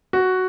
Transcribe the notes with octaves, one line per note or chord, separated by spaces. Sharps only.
F#4